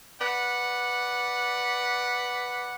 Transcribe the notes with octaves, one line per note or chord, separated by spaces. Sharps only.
B4 D5 F#5